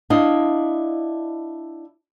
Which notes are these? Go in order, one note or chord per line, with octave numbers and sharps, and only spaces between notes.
D4 E4 D#5 F5